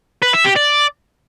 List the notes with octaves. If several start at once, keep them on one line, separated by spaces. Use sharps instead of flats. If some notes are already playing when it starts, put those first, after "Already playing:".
B4
E5
G4
D5